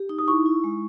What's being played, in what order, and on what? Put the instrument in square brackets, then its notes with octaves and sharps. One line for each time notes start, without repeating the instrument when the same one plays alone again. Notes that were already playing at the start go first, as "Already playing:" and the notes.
Already playing: [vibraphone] G4
D#4
[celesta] D#6
[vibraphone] E4 [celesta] C#6
[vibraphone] E4
G#3